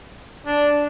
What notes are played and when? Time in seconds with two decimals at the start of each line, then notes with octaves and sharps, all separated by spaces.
0.46 D4